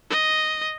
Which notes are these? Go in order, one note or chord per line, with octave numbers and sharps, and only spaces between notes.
D#5